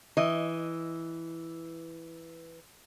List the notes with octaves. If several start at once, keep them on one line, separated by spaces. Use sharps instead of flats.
E3 D#5